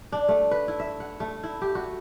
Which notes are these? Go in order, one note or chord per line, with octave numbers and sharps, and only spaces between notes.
D4
A3
B4
E4
E5
F#5
A3
E4
G4
F#4